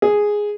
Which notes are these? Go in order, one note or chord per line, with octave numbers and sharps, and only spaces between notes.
G#4